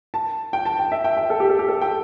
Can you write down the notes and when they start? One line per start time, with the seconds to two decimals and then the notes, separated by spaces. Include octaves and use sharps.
0.14 A5
0.53 G5
0.65 A5
0.79 G5
0.92 E5
1.04 G5
1.17 G5
1.30 A4
1.40 G4
1.49 A4
1.59 G4
1.68 A4
1.81 G5